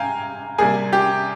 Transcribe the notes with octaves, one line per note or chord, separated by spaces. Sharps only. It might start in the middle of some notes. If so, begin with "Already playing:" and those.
Already playing: C3 F5 G5 G#5 A#5
C3 G3 A#3 G#4 G#5
G4 G5